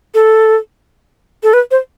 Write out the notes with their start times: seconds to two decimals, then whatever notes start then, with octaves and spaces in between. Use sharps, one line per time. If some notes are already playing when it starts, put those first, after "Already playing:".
0.14 A4
1.43 A4
1.53 B4
1.71 C5